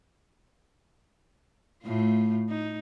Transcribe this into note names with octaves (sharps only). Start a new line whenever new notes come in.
A2 A3 F4
D#4